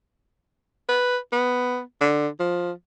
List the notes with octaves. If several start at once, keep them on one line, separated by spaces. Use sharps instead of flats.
B4
B3
D3
F3